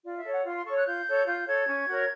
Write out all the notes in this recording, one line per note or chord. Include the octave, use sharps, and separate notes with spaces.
F4 D5
E5
A4 C#5
F#5
F4 C6
C6
A4 C#5 C#6
F#6
F4 G6
A4 C#5
F4 G6
A4 C#5 G#6
C#4
F#4 A#4 C#5